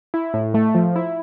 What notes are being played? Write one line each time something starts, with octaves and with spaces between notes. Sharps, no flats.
E4
A2
A3
F3
E4